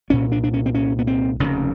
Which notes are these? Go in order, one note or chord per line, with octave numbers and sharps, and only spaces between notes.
C2 A#2 C#4
D4
D4
C#4
C4
C#4
B3
C4
F1 D#2 C#3